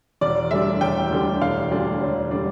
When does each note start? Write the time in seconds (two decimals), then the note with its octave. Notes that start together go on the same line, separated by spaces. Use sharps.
0.21 E1 D5
0.51 D2 D3 G3 D4 E5
0.81 E1 G5
1.11 D2 D3 G3 D4
1.41 E1 F5
1.71 D2 D3 G3 D4
2.01 E1
2.31 D3 G3 D4